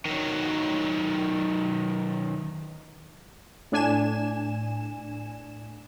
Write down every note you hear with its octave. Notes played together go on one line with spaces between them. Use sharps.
D#3 F#3
A2 D4 G#5 E7